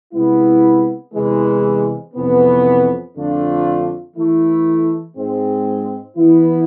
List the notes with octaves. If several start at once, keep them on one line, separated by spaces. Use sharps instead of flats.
C3 G#3 B3 E4
E2 C3 E3 G#3
F2 C3 E3 B3
F2 D3 A3 D4 F4
E3 A3 E4
G#2 G#3 C4
E3 B3 E4